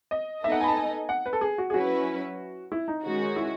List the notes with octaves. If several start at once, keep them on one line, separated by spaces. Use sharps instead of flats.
D#5
B3 D#4 A4 D#5 E5
F#5
G#5
B5
A5
G#5
F#5
B4
A4
G#4
F#4
G#4
F#3 C#4 E4 F#4 B4
E4
D#4
D#3 G#3 C#4 F#4
E4